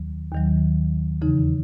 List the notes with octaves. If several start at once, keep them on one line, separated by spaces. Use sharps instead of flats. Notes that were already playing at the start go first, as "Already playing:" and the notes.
Already playing: D#2 D#3 F#3
D#2 D#3 F#3
E2 C#3 E3 D#4